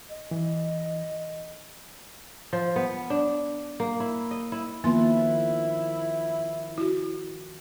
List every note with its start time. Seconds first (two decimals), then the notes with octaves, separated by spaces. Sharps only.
0.10 D#5
0.31 E3
2.53 F3
2.76 B3
3.10 D4
3.80 A#3
4.00 E4
4.31 D#5
4.52 E4
4.84 D#3 F3 A#3 B3 E4 B4 C6
6.78 E4 F#4